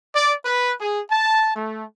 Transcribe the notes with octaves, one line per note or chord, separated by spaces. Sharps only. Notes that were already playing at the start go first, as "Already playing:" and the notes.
D5
B4
G#4
A5
A3